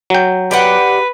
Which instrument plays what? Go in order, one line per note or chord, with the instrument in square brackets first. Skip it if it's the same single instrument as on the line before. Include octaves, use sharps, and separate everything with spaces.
[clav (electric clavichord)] F#3 G5
[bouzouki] G4 D5 F#5 [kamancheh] B4